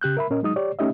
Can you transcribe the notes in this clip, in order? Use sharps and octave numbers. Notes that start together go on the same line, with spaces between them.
C#3 G4 F#6 G6
A#4 E5 B5
A#2 C#4 A#4 D#5
F#3 G#3 D#4 D#6
G4 C#5 D5
A3 C#4 D#4 G4 D#5 E5